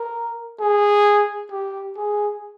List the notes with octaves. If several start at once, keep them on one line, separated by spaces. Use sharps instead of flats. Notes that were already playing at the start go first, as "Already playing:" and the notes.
Already playing: A#4
G#4
G4
G#4